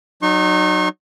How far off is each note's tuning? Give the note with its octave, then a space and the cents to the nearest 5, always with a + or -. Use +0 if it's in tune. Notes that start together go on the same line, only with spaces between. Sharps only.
F#3 +10 D#4 -25 C#6 -40